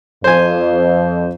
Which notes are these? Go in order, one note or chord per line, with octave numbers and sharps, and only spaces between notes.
F2 C5 G#5